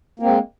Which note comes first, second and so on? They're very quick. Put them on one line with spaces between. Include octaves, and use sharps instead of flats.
A#3 C4 G#3